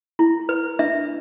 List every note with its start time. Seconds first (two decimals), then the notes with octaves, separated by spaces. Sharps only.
0.19 E4
0.49 B4
0.79 D4 E5